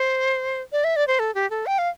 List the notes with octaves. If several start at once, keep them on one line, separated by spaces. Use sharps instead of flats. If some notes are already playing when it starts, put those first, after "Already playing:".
Already playing: C5
D5
E5
D5
C5
A4
G4
A4
G5
F5